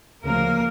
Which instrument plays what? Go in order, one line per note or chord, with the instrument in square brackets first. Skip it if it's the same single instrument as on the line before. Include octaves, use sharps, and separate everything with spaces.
[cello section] D2 C#3 F3 A#3 A#4